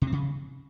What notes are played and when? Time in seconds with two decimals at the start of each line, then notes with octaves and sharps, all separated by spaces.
0.02 C3
0.07 C4
0.12 C#3